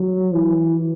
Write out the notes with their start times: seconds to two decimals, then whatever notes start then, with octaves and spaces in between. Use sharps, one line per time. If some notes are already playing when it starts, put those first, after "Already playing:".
Already playing: F#3
0.34 E3